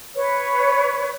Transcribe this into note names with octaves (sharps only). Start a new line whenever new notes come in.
B4 C#5